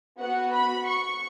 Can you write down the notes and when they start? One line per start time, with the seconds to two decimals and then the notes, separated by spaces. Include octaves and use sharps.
0.19 B3 F#4 F#5
0.53 B5
0.87 C#6